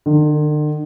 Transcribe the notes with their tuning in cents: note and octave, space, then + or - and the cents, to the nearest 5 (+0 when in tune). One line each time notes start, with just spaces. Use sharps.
D3 +45